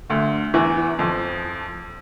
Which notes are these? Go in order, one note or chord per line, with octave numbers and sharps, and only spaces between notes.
D2 D3
E2 E3
F2 F3